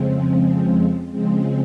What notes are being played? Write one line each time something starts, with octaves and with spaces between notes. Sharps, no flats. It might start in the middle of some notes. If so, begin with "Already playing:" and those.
Already playing: F2 C#3 F3 G#3 C4
C#3 F3 G#3 C4